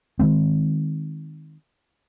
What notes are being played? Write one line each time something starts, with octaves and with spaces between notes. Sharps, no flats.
D#3 E3 G#3 C4